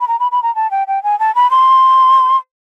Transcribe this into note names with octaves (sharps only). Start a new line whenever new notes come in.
B5
A#5
B5
B5
A#5
A5
G5
G5
G#5
A5
B5
C6